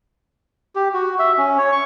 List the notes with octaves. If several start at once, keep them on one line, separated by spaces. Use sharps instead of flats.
G4
F#4
E5
C#4
C#5
C#6